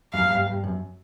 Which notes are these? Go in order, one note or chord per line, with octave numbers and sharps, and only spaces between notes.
F#2 F5
G2
G2
F#2